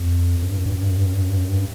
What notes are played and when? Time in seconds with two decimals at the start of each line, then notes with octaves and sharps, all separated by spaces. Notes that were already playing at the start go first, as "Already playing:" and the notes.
Already playing: F2
0.42 F#2
0.49 G2
0.58 F#2
0.66 G2
0.73 F#2
0.81 G2
0.90 F#2
0.97 G2
1.06 F#2
1.14 G2
1.22 F#2
1.29 G2
1.37 F#2
1.49 G2